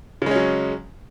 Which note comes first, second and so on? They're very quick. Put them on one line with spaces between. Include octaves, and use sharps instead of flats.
C#3 G#3 C#4 F#3